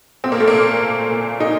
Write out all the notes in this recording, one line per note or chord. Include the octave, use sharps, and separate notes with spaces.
A#2 C4
A#3
A3
A#3
A#2
A#2
A#2
A#2 D#4